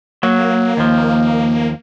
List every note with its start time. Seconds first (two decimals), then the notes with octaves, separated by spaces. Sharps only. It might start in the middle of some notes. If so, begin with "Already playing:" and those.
0.23 F#3 A#3
0.77 D#2 F3